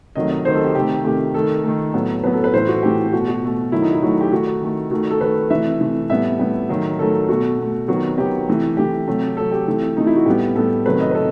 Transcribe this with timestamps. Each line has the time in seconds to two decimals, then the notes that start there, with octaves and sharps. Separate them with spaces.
0.15 C3 D#3 F#3 A3 D#5
0.30 D#5
0.45 C3 D#3 F#3 A3 C5
0.55 A4
0.65 G4
0.75 C3 D#3 A3 G4
1.04 C3 D#3 A3 G4
1.34 D#3 A3 A4
1.64 D#3 A3
1.94 A2 F#3 B3
2.23 A2 F#3 B3 B4
2.33 A4
2.44 B4
2.53 A2 E3 A3 C5
2.68 F#4
2.83 A2 E3 A3 G4
3.13 B2 A3 F#4
3.28 F#4
3.43 B2 A3
3.72 D#3 F#3 A3 E4
3.82 D#4
3.92 E4
4.02 D#3 F#3 A3 F#4
4.21 G4
4.32 D#3 A3 F#4
4.61 D#3 A3
4.91 D#3 A3 F#4
5.11 A4
5.21 D#3 A3 B4
5.50 C3 E3 A3 E5
5.80 C3 E3 A3
6.10 A2 G3 B3 E5
6.39 A2 G3 B3
6.69 D#3 F#3 A3
6.99 D#3 F#3 A3 A4
7.29 B2 A3 F#4
7.59 B2 A3
7.88 D#3 F#3 B3 F#4
8.18 D#3 F#3 B3 G4
8.48 C3 E3 A3
8.77 C3 E3 A3 G4
9.07 C3 F#3 A3
9.37 C3 F#3 A3 A4
9.52 G4
9.67 C3 E3 A3
9.97 C3 E3 A3 D#4
10.07 E4
10.16 F#4
10.26 A2 G3 B3 G4
10.55 A2 G3 B3 A4
10.86 C3 D#3 F#3 A3 B4
11.00 D#5
11.11 B4
11.15 C3 A4